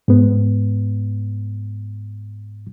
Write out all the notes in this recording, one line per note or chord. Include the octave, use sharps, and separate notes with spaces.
G#2 B3